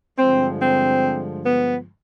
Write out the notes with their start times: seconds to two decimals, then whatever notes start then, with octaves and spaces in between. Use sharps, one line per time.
0.17 G2 D3 F3 G#3 C4
0.60 C4
1.45 B3